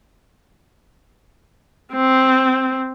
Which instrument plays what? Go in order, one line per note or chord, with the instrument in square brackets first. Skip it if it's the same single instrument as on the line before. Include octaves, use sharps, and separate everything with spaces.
[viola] C4